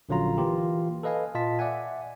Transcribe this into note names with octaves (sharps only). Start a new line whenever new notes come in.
A#1 D3 F#3 C#4 F4 A#5
E3 A#3 F4 G4
A4 B4 D#5 F5 G#5
A#2 F4 D#5 A5 B6
D5 E5 F#5 G#5